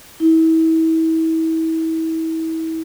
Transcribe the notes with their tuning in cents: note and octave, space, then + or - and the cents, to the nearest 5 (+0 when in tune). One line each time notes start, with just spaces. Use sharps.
E4 -35